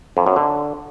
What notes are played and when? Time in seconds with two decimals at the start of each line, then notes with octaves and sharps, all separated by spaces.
0.17 F2
0.26 F#2
0.36 D3